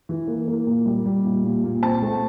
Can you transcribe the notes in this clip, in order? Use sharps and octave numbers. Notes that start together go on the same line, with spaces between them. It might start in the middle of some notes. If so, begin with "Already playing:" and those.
E3
A#3
A#3
A#2
G3
G3
A#2
A#2
A#2
C4 A5
A3